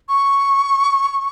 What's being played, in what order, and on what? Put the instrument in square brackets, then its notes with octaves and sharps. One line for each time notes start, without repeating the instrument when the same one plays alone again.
[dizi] C#6